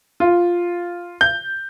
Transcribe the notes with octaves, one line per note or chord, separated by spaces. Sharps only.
F4
G6